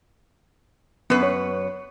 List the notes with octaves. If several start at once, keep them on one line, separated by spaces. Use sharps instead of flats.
F#2 B3 B4
C#5